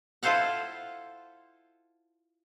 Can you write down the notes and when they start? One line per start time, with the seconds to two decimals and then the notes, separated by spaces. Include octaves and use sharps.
0.23 E4 F4 A4 C5 F5 F#5